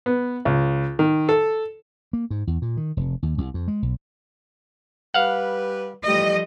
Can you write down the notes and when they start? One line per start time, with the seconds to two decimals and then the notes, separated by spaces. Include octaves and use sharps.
0.06 B3
0.45 C#2
0.99 D#3
1.29 A4
2.13 A#3
2.30 G#2
2.47 E2
2.62 A#2
2.77 D#3
2.97 F1
3.23 D#2
3.38 C2
3.54 F2
3.68 G#3
3.82 B1
5.14 G3 B4 F5 F#5
6.06 E3 F3 G3 A3 D#5